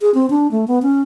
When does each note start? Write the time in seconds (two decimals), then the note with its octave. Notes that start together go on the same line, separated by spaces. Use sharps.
0.01 G#4
0.14 C4
0.30 D4
0.51 A3
0.68 B3
0.82 C#4